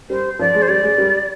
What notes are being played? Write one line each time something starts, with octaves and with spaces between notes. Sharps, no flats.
G3 C5
F3 D5
G#3
C5
G3 D5
G#3
G3